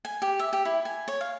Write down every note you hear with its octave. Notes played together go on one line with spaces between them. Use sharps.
G#5
G4
E5
G4
E4
G#5
C#5
F5